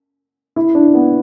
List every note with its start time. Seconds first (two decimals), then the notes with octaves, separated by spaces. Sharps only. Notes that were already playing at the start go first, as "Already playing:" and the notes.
0.56 E4
0.75 D4
0.94 B3